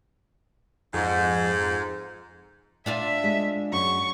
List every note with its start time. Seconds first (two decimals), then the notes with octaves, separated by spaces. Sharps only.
0.94 F2 G#2
2.86 D4 F4 D5 E5
3.24 G#3
3.73 F#2 C#6